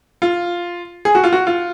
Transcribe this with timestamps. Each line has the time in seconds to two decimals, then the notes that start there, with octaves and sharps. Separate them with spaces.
0.22 F4
1.05 G#4
1.15 F#4
1.24 F4
1.33 F#4
1.47 F4